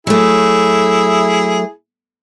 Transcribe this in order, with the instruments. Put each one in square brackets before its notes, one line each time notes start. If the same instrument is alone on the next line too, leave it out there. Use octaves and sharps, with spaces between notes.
[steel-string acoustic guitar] F#3 A3 [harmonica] E4 G#4